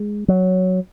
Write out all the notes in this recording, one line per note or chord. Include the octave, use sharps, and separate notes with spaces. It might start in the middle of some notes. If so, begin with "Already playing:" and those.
Already playing: G#3
F#3